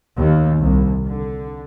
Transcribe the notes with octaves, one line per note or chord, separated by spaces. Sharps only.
D#2
C2
D3